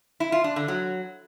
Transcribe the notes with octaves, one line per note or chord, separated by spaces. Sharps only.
E4
F4
D4
D3
F#3